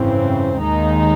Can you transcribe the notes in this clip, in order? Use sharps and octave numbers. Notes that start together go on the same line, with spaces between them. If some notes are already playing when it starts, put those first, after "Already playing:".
Already playing: G#1 F#2 C#3 E3 C4
D#2 D#3 G#3 D#4